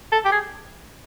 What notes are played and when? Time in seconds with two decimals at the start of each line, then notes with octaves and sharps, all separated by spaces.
0.12 A4
0.25 G4
0.32 G#4